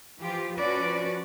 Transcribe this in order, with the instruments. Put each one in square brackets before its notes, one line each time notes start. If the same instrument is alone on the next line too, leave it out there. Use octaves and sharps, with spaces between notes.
[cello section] E3 F3 F4 G4
F3 C#4 F#4 B4 D5